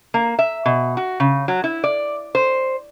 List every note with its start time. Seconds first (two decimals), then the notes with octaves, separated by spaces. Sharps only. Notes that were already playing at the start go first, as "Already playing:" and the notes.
0.14 A#3
0.39 E5
0.66 B2
0.97 F#4
1.20 C#3
1.48 F#3
1.64 E4
1.84 D5
2.35 C5